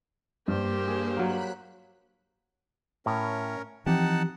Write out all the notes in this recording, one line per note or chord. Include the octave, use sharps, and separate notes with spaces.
G2 A#3 G4 C5
G#4
F#3 A#3 B5 F#6
A2 C#4 A#4
E3 F3 C4 D#4 G4 F#5 A5